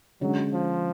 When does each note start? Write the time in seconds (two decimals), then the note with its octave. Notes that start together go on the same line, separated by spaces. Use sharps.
0.21 D3 F#3 G#3 C#4
0.52 F3